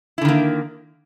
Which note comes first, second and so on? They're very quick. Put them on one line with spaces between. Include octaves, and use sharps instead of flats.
E4 D3 D#3 A#3